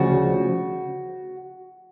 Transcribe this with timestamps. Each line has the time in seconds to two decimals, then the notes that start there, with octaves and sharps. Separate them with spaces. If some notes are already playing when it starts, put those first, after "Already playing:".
Already playing: D2 C#3 F3 F#4